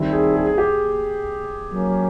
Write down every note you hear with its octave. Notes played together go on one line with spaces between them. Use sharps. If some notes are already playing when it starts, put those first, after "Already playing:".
Already playing: D#3 G3 C4 E4 A4
G#4
G#4
G#4
G4
F#3 A#3 C#4